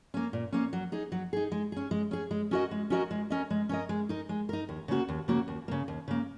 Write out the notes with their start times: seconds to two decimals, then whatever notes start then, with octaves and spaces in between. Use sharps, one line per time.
0.14 A#3 C#4
0.33 A#2
0.52 A#3 C#4
0.73 F#3
0.92 D#4 G#4
1.12 F#3
1.33 D#4 G#4
1.52 G#3
1.72 C#4 G#4
1.91 G#3
2.11 C#4 G#4
2.31 G#3
2.51 C#4 F#4 A#4 D#5
2.71 G#3
2.90 C#4 F#4 A#4 D#5
3.11 G#3
3.30 C#4 A#4 D#5
3.50 G#3
3.69 C#4 A#4 D#5
3.89 G#3
4.09 D#4 A#4
4.29 G#3
4.49 D#4 A#4
4.69 D#2
4.88 C#3 A#3 F#4
5.08 D#2
5.28 C#3 A#3 F#4
5.48 D#2
5.68 C#3 A#3
5.88 D#2
6.08 C#3 A#3